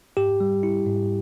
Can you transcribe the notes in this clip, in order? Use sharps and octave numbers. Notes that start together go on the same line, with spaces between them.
G#2 G4
G3
E4
G#2